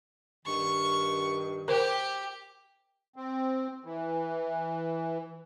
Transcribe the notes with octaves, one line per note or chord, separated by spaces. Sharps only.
G2 D#3 C#6
G4 A#4 C5
C4
E3